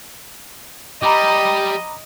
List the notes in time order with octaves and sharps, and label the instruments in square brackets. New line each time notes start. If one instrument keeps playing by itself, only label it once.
[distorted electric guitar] G3 [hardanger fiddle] D#5 [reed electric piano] A#5 B5 D6